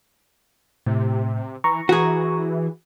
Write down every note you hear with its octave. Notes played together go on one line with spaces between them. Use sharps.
A2 C3
E3 A#5 C#6
E3 F#4 G#4